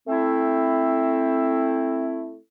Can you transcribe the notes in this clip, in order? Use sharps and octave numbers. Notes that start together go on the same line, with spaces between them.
A3 C4 E4